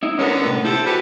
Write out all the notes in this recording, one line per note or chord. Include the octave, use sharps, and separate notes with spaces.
D#4 E4
D3 B3 C#4 A4 A#4
A2 C3
E4 G4 A4 C5
E3 F#4 G4 B4